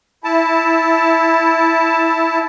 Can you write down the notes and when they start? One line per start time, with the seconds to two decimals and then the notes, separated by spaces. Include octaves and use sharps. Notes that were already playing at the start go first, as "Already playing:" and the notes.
0.24 E4 A5